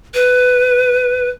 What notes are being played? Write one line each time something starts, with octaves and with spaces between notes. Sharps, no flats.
B4